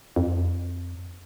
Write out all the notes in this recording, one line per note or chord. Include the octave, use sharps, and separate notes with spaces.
F2